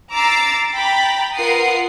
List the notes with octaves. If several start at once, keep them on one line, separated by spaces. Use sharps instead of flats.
A#5 D6 E6 A6 C7
G5 A#5 B5 A6 B6
F4 A#4 B4 F#5 D#6 C7